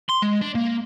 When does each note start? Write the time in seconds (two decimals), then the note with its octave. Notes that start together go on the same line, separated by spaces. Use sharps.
0.09 C6
0.22 G#3
0.41 D4
0.55 A#3